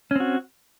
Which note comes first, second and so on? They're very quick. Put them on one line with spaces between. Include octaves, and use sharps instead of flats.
C#4 C4 F#4